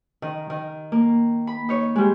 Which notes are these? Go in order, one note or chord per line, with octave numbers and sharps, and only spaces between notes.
D#3
D#3
A#3
B5
D#4 C#5
G3 G#3